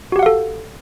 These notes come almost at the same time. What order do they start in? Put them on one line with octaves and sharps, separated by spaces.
F#4 G4 F#5 F5 A4